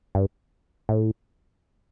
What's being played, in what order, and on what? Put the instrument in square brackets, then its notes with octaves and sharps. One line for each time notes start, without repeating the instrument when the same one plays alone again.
[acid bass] G2
A2